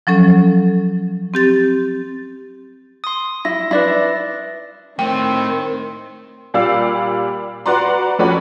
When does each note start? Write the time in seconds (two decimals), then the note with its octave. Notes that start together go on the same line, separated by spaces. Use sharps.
0.07 F3 F#3 C#4 A4
1.34 C4 G4 A6
3.04 C6 D#6
3.45 E4 A#6
3.71 D4 E4 B4 D5 A#6
4.99 A2 D#3 A3 C4 G5
6.54 A#2 G3 G4 D5 F5 E6
7.66 F#4 B4 D5 A#5 C6
8.19 F2 A3 C#4 F#4 D5 B5